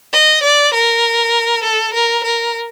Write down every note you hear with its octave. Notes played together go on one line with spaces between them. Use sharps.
D#5
D5
A#4
A4
A#4
A#4